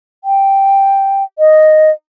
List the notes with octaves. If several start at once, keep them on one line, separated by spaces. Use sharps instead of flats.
G5
D#5